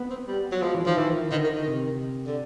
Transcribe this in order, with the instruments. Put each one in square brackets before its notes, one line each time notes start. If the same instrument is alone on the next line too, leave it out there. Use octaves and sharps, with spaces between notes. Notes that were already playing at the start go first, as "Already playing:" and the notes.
Already playing: [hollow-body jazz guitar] B3
[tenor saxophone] C4
G3
F#3
[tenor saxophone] F3 [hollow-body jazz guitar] G#3
[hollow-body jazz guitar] E3
[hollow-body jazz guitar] D#3 [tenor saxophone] F3
[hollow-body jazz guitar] D#3 [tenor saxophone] E3
[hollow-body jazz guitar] D3 [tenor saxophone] D#3
[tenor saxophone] D#3
D#3
[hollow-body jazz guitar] C3
[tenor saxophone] D3